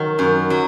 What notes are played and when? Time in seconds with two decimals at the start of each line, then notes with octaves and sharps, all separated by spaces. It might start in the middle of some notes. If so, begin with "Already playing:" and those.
Already playing: D#3 F#3
0.19 F#2
0.50 F#3